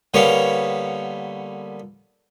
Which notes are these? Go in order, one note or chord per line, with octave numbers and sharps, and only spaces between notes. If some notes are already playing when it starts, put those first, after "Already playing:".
D3 G3 A#3 B3 C#5